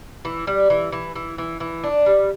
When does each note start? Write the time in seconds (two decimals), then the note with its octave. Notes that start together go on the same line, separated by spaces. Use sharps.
0.25 E3
0.47 G3
0.70 E3
0.92 E3
1.16 E3
1.38 E3
1.60 E3
1.84 D4
2.06 G3